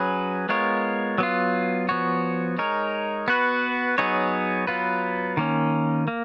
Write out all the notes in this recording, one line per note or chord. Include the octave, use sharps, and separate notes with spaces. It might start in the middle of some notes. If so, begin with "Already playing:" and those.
Already playing: F#3 C#4 G#4 B4
G#3 B3 F4 A#4 C#5
F#3 B3 F4
F3 B3 F#4 C#5
G#3 D#4 A#4 C#5
B3 F#4 B4
F#3 B3 D#4 G#4 C#5
F#3 B3 F4 B4
D#3 A#3 C#4
A#3